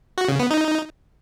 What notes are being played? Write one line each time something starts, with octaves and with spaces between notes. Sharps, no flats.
F#4
C#3
B3
D#4